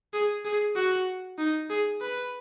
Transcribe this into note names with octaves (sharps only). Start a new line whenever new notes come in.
G#4
G#4
F#4
D#4
G#4
B4